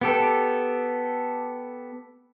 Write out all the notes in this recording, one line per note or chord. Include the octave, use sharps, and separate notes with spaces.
B3 G4 A4